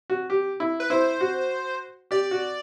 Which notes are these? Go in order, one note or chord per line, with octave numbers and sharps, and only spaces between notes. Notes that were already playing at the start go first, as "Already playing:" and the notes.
F#4
G4
E4
B4
E4 C5
F#4
G4 D5
F#4